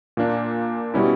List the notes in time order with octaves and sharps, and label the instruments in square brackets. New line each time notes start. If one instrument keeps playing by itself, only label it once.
[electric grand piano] A#2 A#3 D4
B2 G3 C#4 E4